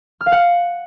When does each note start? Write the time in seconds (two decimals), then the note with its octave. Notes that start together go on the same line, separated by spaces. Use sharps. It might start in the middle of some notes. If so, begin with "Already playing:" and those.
0.21 F6
0.26 F5
0.32 F#5